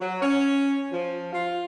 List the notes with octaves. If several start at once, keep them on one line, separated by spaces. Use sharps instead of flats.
F#3
C#4
F3
F4